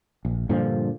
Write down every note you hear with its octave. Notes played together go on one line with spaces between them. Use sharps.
A#1
G2 A#2 D3 F3